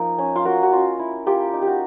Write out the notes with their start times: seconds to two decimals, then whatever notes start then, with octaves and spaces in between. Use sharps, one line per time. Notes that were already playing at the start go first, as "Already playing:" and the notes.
Already playing: F3 A#3 D#4
0.18 C#4
0.36 F4
0.45 A#3 F#4
0.63 F#4
0.72 C#4 F4
0.99 E4
1.26 A#3 F4 G4
1.53 D#4
1.62 G4
1.67 F#4